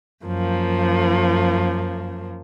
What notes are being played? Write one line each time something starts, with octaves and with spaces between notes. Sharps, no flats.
F#2 F3 A#3